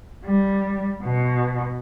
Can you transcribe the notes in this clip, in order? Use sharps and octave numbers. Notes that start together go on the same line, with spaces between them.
G3
B2